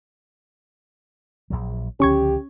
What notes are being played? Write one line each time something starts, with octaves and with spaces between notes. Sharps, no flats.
A#1 D#2 F#3
C#2 D3 F3 C#4 G4 C#6 G#6